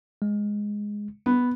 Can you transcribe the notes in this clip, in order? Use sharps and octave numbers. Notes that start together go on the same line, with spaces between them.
G#3
B3